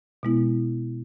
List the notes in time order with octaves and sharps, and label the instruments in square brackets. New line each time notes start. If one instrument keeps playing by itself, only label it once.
[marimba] B2 G#3 B3 E4